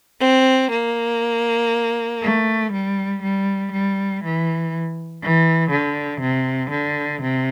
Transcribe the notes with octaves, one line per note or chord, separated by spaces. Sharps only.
C4
A#3
A3
G3
G3
G3
E3
E3
D3
C3
D3
C3